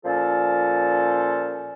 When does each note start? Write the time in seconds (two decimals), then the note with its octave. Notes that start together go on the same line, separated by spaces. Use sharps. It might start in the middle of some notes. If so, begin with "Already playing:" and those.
0.05 A#2 F3 C#4 A4